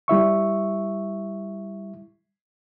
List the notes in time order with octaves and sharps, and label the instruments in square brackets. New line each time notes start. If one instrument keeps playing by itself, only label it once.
[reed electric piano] G3 E4 E5 C#6